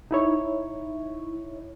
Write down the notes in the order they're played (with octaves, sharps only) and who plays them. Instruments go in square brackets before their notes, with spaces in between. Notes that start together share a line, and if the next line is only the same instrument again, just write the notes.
[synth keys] D#4 E4 C#5